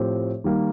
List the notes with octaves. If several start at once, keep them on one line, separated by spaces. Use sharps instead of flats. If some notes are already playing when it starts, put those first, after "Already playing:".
Already playing: A2 F3 A3 C4 G4
D#3 G3 A#3